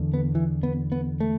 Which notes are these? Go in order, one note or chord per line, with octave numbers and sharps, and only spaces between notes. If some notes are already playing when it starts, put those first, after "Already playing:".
Already playing: E2 D3
B3
E3
B3
B3
A3